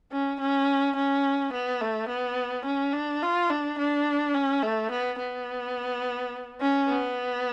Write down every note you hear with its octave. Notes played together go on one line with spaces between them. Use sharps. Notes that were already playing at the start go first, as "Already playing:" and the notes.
C#4
C#4
C#4
B3
A3
B3
C#4
D4
F4
D4
D4
C#4
A3
B3
B3
C#4
B3